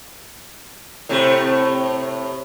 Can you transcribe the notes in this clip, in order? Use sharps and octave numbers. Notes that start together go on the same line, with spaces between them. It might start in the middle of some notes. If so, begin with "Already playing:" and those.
A2 C3 A3